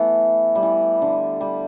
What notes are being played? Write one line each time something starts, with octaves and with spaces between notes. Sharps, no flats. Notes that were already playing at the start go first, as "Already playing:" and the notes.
Already playing: E3 A3 B3
G3
E3
D3
G3